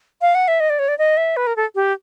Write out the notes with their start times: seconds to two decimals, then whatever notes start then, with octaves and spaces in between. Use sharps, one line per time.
0.22 F5
0.35 F#5
0.48 E5
0.60 D#5
0.70 D5
0.79 C#5
0.88 D5
0.98 D#5
1.17 E5
1.37 B4
1.47 A#4
1.56 A4
1.75 G4